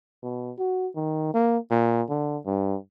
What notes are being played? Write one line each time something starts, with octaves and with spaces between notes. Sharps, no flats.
B2
F#4
D#3
A#3
A#2
D3
G2